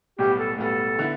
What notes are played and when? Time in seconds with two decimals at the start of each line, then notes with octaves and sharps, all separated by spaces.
0.19 B1 A2 G3 B3 G4
0.39 A4
0.58 B1 A2 G3 B3 A4
0.99 D3 B3 E4